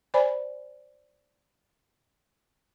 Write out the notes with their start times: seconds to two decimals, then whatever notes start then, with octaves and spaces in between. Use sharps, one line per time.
0.14 C5 D5 G#5 B5